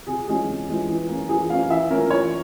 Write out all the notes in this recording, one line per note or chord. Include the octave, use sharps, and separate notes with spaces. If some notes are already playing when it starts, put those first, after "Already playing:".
C3 G#4
E3 G#3 C#4 G#4
C3
E3 G#3 C#4
E3
A#3 C#4
E3 G#4
A#3 C#4 F5
E3 E5
A#3 C#4 A#4
E3 C#5